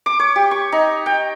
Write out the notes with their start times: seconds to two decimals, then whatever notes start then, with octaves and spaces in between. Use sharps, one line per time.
0.06 D6
0.20 C#5
0.36 G4
0.51 C#6
0.72 D#4
1.06 G5